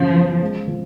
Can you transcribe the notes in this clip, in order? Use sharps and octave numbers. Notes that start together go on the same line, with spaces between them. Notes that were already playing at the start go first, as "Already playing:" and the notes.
Already playing: F#2 C#3 F3
B3
G#3
F3